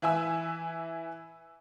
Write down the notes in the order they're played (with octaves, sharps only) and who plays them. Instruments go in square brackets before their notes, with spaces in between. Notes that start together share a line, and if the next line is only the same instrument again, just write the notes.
[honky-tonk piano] E3 E4 G#5 E6